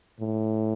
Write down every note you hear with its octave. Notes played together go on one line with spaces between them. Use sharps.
A2